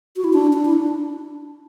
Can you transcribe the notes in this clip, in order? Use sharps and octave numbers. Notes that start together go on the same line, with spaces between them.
F#4
E4
D4
D4
E4
D4